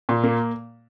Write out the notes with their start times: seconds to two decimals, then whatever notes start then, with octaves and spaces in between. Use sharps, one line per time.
0.09 A#2
0.23 A#3